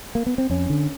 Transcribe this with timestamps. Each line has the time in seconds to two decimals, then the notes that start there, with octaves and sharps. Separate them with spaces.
0.15 A#3
0.26 B3
0.38 C4
0.50 F2 C#4
0.70 D3